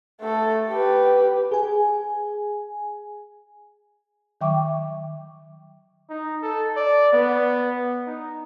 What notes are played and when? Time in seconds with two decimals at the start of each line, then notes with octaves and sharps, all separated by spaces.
0.21 A3 A4
0.69 G4 B4
1.51 G#4 G#5
4.41 D#3 F#3 E5 G5 C#6 D6
6.10 D#4
6.42 A4
6.77 D5
7.13 B3
8.07 D#4